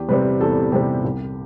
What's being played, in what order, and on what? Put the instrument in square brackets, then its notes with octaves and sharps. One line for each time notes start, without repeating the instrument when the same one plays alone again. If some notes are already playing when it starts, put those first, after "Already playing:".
Already playing: [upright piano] E2 G4
C3 G3 C4 B4
E2 A4
C3 G3 C4 G4
C2